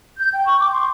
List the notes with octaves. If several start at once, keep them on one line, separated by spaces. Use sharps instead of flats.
G6
G5
C#6
D6
C6